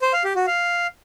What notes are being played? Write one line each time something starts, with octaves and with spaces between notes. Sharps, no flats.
C5
F5
G4
F#4
F5